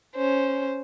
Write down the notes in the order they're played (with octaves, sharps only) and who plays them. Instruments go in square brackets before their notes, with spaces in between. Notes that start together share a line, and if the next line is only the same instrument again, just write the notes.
[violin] C#4 C5